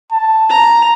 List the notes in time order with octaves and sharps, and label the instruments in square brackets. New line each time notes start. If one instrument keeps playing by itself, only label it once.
[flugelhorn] A5
[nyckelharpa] A#5